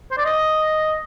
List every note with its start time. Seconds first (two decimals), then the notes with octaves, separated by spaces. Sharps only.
0.11 C5
0.18 D5
0.25 D#5